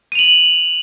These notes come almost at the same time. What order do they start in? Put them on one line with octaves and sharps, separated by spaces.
D#7 F7 F#7